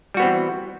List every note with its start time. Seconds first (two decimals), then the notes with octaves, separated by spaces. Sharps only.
0.14 G3
0.17 F#4
0.20 B3
0.22 C4
0.25 E3